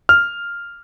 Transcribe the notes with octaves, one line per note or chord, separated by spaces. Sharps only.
F6